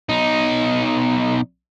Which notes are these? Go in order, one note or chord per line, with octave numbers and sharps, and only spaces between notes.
B1 D#4